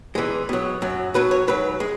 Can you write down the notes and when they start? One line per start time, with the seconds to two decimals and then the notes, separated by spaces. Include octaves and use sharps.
0.15 E2 E3 G#3
0.49 B2 F#3
0.82 F#2 F#3
1.14 B2 F#3 B4
1.31 C#5
1.48 G#2 F#3 B4
1.80 G#3